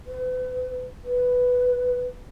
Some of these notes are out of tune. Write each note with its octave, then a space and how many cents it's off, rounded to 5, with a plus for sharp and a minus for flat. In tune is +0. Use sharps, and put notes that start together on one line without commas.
B4 +45
B4 +5